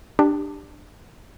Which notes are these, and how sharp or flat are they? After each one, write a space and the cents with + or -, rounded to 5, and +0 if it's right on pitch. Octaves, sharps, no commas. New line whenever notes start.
D4 +15 G4 +10